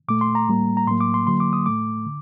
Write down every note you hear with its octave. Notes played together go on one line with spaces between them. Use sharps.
A#2 A3 D6
C6
A#5
A2 G3 A#3
A#5
A2 F#3 A#3 C6
D6
C6
D3 F#3 A#3 C6
D6
D#6
A2 A3 D6
D3